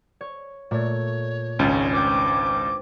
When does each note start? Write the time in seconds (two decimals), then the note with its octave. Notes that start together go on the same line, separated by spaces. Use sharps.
0.21 C#5
0.71 A#2 A3 C#5
1.59 G#1 C#2 G#3 C#4 D4
1.93 B4 C5 G5 D6